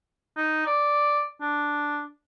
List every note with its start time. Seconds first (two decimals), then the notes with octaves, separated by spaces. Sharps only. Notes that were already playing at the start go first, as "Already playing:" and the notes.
0.37 D#4
0.66 D5
1.42 D4